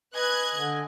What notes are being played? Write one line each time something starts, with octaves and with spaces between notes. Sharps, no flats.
B4 D#5 G#5 F#6 G#6
D3